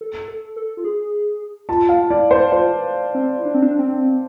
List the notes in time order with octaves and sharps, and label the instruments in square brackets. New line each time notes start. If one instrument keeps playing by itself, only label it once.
[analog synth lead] A4
A4
A4
F4
G#4
[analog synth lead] F4 [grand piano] A5
[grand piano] F5
[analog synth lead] F4
[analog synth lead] E4 [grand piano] D5
[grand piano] C5
[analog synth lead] F4 [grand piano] C5
[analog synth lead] B4
C4
E4
D4
C4
D4
C4